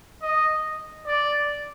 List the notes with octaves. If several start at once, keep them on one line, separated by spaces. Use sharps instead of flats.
D#5
D5